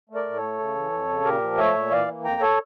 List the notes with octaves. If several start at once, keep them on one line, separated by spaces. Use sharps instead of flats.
A3
A#4 D5
A2
A4 C#5
A3
C#3
E3
F2
C#3
A#2 G4 A#4
F3
A3 C#5 E5
A#2
E3 D5 F5
A#3
F2 G5 A#5
A4 C#5